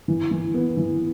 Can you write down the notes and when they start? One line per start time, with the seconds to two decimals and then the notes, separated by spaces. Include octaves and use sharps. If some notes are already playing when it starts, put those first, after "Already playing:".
0.08 E3
0.31 E3
0.54 B3
0.77 E3